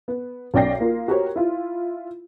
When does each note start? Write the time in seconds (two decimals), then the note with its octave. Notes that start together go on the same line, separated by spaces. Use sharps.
0.08 B3
0.54 B1 C#4 D5 G5 A#6 C7
0.80 A#3 F4
1.08 F#4 G4 A#4 C5 C#5
1.36 E4 F4